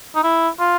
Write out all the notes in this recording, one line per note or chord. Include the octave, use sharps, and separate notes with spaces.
D#4
E4
F4